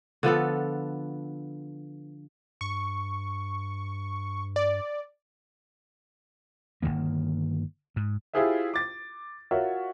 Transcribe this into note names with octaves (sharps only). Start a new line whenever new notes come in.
D3 F3 B3 A4
G2 C#6
D5
G1 F#2 D#3 A#3
G#2
E4 F4 G4 G#4 C5 E5
D6 A6
F4 F#4 A#4 C#5 E5